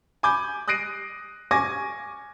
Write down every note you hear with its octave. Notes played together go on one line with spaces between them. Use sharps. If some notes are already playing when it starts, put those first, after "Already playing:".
G#5 B5 D6 G6
D#6 F#6 A#6 C7 D7 D#7
G#5 C#6 D6 G#6 A#6